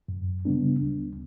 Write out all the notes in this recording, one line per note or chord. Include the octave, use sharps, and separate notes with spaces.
F#2
C#3 G3 B3 D4
D2